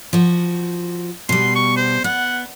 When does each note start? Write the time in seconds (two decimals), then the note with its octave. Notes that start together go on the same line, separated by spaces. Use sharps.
0.13 F3 F#4
1.29 B2 G3 C6
1.55 C#6
1.76 C5
2.04 B3 F#5